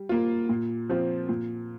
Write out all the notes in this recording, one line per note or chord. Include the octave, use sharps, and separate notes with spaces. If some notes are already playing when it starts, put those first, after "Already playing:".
Already playing: G3
A#3 F4
A#2
F3 C4 F4
A#2